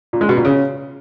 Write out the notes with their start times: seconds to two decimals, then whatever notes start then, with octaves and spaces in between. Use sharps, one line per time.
0.13 A#2
0.21 G#3
0.29 B2
0.37 A#2
0.45 C#3